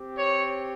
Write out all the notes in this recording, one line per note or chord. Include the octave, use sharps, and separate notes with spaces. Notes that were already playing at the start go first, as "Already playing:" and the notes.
Already playing: C4 G4
C#5